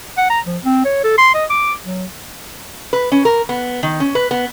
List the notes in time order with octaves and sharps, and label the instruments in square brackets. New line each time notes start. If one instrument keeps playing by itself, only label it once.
[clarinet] F#5
A#5
F3
C4
C#5
A4
C6
D#5
D6
F#3
[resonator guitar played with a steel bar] B4
C#4
A#4
B3
D#3
C#4
B4
B3